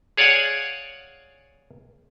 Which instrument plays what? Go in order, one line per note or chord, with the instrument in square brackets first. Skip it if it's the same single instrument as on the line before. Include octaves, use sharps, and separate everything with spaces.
[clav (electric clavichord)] G#4 C#5 D5 F5 F#5 G#5